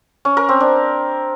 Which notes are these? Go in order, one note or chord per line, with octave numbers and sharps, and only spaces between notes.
C#4
A#4
C4
D4